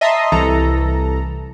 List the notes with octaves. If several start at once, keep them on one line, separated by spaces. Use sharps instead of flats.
D#5 E5 A5 A#5 C6 D#6
C2 E3 A4 A#5